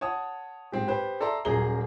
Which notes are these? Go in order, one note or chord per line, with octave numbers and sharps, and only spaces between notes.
C#5 F#5 A5 D#6
G#2 C4 G4
G4 B4 C5
A4 D5 E5 A#5 C6
D#1 F#3 C#4 G#4 A#5 G7